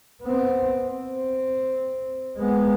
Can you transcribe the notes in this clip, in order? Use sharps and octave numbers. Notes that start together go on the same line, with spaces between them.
B3 C4
C4
G#3 B3